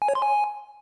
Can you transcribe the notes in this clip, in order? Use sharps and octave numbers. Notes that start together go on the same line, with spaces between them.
G#5
C#5
C6
G#5